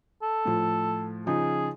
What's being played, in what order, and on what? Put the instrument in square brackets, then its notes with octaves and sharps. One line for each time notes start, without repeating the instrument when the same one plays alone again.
[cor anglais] A4
[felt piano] A2 F3
[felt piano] C#3 F3 D#4 [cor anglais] G#4